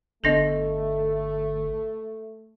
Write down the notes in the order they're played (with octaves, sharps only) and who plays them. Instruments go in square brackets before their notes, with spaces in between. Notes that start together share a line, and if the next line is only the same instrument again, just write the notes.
[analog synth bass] G1 [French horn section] A3 [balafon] B3 D4 A4 [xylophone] D#5 A#6 F7